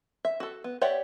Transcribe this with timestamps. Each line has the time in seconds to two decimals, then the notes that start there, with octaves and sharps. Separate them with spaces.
0.25 E5
0.40 F#4 A4
0.64 B3
0.81 G4 C#5 D5 E5 F#5